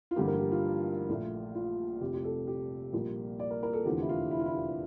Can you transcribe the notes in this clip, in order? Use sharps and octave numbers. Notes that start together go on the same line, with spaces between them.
F4
A1 G2 D3 F3 A#3 G4
A#4
G4
F4
A#1 A#2 A3
F4
F1 F2 C3 G4
G4
A4
G4
A#1 A#2 G3 A#3
D5
A#4
A#4
A4
F1 E2 D3 F3 G4
E4
F4
E4
F4
E4
F4